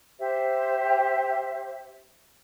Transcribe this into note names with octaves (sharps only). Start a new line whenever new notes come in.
G4 C5 E5